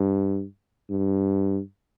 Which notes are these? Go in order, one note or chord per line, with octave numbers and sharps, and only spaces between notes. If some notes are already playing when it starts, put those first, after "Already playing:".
Already playing: G2
G2